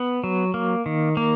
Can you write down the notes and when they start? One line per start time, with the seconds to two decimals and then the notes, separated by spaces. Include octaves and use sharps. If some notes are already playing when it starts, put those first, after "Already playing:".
Already playing: B3
0.24 F#3
0.54 A#3
0.86 D#3
1.17 A#3